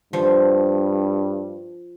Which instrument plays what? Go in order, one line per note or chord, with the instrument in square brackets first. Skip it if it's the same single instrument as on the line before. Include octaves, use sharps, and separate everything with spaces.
[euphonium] G2 [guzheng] F3